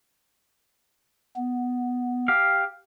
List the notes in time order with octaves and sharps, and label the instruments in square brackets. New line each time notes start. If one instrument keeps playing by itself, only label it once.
[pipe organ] B3
[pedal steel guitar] G4 F5